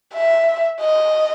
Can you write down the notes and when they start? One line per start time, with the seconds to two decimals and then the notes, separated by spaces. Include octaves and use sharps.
0.14 E5
0.80 D#5